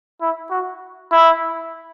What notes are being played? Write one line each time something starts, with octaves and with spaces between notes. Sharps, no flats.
E4
F#4
E4